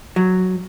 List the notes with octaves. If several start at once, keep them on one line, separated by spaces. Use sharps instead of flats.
F#3